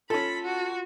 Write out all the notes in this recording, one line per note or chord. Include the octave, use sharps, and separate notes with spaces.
C#4 F4 A4 B5
F#4